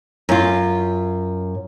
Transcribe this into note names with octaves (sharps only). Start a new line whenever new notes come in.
F#2 F4